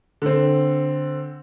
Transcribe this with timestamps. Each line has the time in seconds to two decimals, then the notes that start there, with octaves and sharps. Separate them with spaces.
0.22 D3 C4